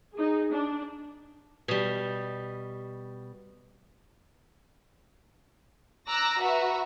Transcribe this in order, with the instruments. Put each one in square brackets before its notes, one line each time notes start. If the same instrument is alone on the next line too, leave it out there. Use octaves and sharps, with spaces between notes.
[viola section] D#4 G#4
D4
[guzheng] B2 G3
[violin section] A#5 D6 E6 F#6 A#6
F#4 B4 E5 F#5 A#5